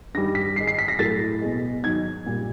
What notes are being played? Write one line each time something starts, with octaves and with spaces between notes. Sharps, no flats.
G2 D#3 G3 A#6
B6
G#2 D#3 G#3 C7
C7
B6
A#6
A2 F#3 A3 A6
B2 G#3
G#2 D#3 F#3 G#6
A#2 G3